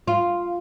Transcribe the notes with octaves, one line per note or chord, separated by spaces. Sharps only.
F4